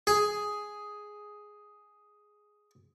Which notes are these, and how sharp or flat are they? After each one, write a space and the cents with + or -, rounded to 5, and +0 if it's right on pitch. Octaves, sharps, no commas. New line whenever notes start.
G#4 +5